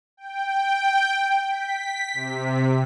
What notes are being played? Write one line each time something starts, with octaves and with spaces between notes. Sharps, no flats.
G5
B6
C3